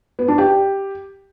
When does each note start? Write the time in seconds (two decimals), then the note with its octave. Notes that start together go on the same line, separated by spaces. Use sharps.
0.19 B3
0.28 D4
0.38 G4